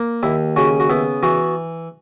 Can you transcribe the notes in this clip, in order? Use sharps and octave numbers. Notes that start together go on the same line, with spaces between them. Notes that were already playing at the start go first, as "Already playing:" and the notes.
Already playing: A#3
D#2 E4
C#3 F#4
F#4
B3 E4
E3 F#4